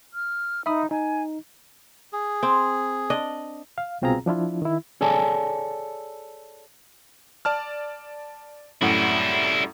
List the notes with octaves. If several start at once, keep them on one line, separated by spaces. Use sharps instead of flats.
F6
D#4 E5 B5 D#6
D#4 G#5
G#4
C4
D4 D#5
F5
C2 B2 C4 F4 G#4 A#5
F3 D4 E4 F4
D#3 E4
G#4 A4 C#5 D5 G#5 A5
D5 A5 F6
F#2 A2 G3 E4 F#5